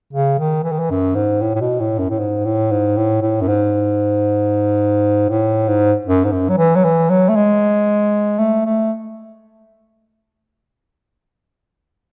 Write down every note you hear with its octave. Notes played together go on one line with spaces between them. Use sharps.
C#3
D#3
E3
D#3
E3
F#2
G#2
A2
A2
B2
A2
F#2
A2
G#2
A2
G#2
A2
A2
F#2
G#2
A2
G#2
F#2
G#2
F#2
F#3
E3
F#3
E3
F#3
A3
G#3
A3
A3